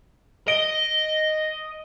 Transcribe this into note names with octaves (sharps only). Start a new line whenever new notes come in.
D#5 D7 G7